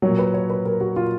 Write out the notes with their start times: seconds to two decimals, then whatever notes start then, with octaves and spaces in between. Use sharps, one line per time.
0.02 A#2 F#3 C#5
0.19 B4
0.34 C#5
0.50 B4
0.65 A#4
0.81 F#4
0.96 F4